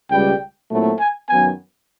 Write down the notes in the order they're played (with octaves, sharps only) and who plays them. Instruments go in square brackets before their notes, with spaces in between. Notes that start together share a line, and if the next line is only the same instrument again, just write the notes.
[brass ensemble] C#2 B2 G3 [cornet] G5
[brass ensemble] A#2 F#3 A3 C4 E4
[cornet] G#5
[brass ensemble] F#2 D#3 F#3 B3 [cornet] G#5